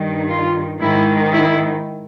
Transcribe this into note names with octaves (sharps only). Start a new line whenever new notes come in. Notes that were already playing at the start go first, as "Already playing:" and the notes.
Already playing: G2 D#3
F4
G#2 D#3 E4
E4